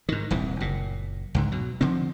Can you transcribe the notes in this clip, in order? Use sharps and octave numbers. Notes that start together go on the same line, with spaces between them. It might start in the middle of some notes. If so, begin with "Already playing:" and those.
G#2 D#3
D#1 C2 E3
F#1 A#2
C#2 G#2 D3
B2 F#3
D3 F3 C4